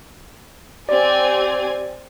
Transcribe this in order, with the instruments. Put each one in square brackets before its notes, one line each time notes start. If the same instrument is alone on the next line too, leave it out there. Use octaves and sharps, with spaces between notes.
[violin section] C4 G#5 [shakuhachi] G4 [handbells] D5